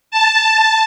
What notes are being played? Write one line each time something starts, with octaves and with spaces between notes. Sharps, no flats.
A5